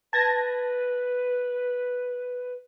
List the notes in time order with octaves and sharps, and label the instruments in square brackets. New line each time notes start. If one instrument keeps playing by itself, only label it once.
[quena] B4 [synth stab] A5 G#6 A#6